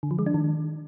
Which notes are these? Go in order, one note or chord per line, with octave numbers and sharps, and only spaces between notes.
D3
F3
G#3
D4
D#3